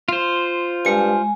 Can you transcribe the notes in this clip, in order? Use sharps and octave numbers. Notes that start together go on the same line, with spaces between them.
F4 C5
G2 G#3 G#5